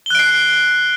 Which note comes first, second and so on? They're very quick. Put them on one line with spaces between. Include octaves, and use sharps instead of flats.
G7 F#6 D7 C7